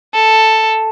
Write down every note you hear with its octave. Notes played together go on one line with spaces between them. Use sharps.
A4